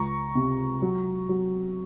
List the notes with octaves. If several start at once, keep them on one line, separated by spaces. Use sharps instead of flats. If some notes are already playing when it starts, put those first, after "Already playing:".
Already playing: C#2 A#5 C#6
C3
F#3
F#3